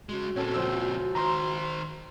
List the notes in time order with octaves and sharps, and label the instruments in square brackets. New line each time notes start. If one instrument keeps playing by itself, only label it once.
[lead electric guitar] C#3 G#3 [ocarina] F#4
[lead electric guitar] A#2 C4 [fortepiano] C#4 A4
[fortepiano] C#2 F3 E6
[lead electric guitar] D#3 C5 [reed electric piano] A#5 C6